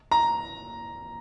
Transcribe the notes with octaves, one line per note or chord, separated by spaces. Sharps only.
A#5